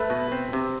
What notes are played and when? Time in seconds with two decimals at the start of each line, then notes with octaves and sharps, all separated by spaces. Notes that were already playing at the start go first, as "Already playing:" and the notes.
Already playing: A3 B4
0.10 B2
0.32 C4
0.53 C3